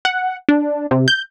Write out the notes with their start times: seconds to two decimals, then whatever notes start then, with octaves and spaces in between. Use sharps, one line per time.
0.05 F#5
0.49 D4
0.91 C3
1.08 G6